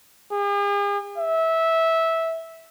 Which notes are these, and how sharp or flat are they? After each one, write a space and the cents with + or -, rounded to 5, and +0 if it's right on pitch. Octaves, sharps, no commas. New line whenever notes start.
G#4 -45
E5 -15